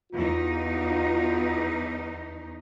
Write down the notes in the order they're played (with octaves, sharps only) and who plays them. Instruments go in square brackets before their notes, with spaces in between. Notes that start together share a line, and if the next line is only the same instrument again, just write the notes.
[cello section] E2 D#4 [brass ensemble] F4 F#4